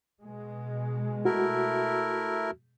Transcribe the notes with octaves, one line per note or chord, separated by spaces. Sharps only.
B2 G#3
A3 E4 F#4 A#4